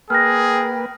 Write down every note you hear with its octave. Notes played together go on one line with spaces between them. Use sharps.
A#3 G#4 B4 G5 F6 F#6 A#6